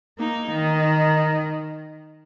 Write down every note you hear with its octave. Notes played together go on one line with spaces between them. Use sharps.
A#3 D#4
D#3